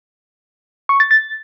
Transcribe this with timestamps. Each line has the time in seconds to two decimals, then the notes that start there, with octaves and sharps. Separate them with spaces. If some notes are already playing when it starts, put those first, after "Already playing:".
0.89 C#6
1.00 A6
1.11 A6